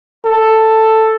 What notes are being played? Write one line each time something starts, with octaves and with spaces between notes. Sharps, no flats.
A4